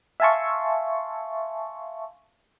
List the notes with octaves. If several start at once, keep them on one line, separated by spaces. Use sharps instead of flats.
E5 F5 G#5 A5 C6 C#6